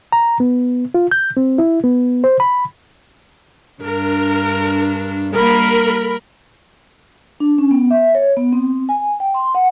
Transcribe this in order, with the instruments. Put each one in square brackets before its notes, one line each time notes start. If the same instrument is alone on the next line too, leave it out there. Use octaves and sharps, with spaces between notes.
[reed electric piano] A#5
B3
F4
G6
C4
E4
B3
C5
B5
[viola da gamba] G2 D4 [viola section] A#4
[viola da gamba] G3 A#3 [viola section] A#4 B5
[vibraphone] D4
C#4
B3
E5
C#5
B3
C4
G#5
G5
C6
F#5